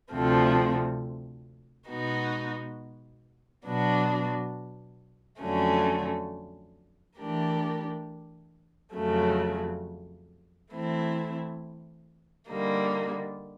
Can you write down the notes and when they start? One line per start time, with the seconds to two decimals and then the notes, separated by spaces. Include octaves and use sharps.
0.11 D2 C3 F3 A3 C4
1.89 B2 G#3 B3 D#4 F#4
3.66 B2 F#3 B3 D4 F#4
5.42 F2 D3 F#3 A3 C#4
7.18 E3 A3 D4 G4 A#4
8.95 F2 C#3 F#3 A3
10.72 E3 A3 C4 E4
12.49 D3 G3 A#3 D#4